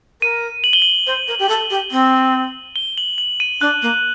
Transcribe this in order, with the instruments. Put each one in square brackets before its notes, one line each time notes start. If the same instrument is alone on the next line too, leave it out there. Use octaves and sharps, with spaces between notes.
[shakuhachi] A#4 [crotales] D#7
[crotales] F#7
G7
F#7
[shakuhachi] C5
A#4
G4
A4
G4
C4
[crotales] G7
F#7
F#7
D#7
[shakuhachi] D4 [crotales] F#6
[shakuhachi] A#3